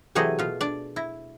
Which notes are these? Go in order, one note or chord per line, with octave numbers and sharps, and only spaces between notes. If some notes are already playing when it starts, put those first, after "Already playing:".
C3 E3 F#3 A3 G#4 D#5
B2 F4
D4 D5
E4